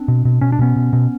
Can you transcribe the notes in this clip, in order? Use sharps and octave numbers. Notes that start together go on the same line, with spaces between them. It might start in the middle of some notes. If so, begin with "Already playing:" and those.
Already playing: C4 D4
B2
B2
B2 C#4
D4
B2 B3 C#4
B2
B2